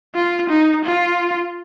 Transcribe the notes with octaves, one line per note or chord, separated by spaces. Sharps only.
F4
D#4
F4